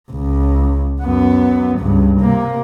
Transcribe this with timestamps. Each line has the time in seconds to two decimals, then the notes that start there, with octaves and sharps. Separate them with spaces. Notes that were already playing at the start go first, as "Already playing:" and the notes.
0.11 C#2
1.02 F#2 B3
1.78 C#2 G2
2.20 C3 A#3